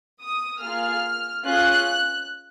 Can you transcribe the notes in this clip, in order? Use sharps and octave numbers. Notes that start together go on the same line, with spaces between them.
D#6
A#3 F4 G#4 F6
C#4 F4 G#4 F#6